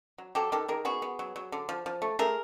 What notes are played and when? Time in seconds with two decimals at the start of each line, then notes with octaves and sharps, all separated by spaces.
0.18 F#3
0.35 F#3 G4 A4
0.52 D#3 G4 A4
0.68 D#3 G#4 A#4
0.85 B3 F#4 G#4
1.02 B3
1.19 F#3
1.36 F#3
1.52 D3
1.69 F3
1.86 F3
2.02 A3
2.19 A3 G#4 A#4